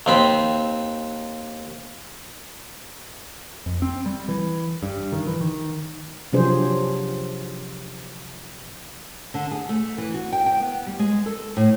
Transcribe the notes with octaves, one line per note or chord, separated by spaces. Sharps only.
D#2 C4 B5
F2
C4
G3
E3
G2
D#3
E3
D#3
C3 F3 F#3 D4 G#4 C5
D3
G#4
A3
E3
F#4
G5
G5
B3
G3
G#3
A4
A2